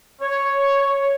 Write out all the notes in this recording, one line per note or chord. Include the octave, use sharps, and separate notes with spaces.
C#5